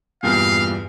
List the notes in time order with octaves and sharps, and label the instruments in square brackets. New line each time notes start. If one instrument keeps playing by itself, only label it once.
[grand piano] E2 G2 A#2 [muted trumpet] F5